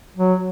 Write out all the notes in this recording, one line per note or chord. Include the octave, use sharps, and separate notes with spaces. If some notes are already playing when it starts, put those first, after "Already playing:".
F#3